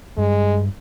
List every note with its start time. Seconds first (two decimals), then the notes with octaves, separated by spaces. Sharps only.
0.18 G2 G#3